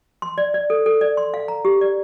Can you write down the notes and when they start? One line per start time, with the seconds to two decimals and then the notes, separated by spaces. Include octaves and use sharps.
0.22 C6
0.38 D5
0.54 D5
0.70 A4
0.86 A4
1.01 D5
1.17 C6
1.34 F5
1.48 A#5
1.65 G4
1.81 D5